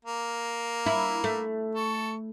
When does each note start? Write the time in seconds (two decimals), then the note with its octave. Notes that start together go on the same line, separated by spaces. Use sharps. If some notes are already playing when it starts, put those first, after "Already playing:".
0.05 A#3
0.86 E4
1.24 A3
1.75 A4 C#6